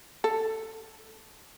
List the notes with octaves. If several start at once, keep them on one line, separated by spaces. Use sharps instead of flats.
A4